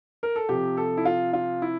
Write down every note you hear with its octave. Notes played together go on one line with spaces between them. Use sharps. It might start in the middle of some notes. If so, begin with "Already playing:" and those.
A#4
A4
C3 F3 C4 G4
A4
E4
F4
F4
E4